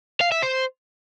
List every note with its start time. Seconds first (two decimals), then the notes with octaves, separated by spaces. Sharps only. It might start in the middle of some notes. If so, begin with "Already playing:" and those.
0.21 F5
0.32 E5
0.42 C5